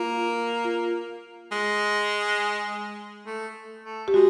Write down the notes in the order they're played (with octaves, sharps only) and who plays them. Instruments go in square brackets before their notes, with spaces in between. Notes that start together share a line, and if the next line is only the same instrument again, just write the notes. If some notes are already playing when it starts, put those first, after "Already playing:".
Already playing: [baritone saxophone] A#3 [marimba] F4
[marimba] F4
[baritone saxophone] G#3
A3
A3
[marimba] G4
[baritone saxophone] G#3 [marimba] F#4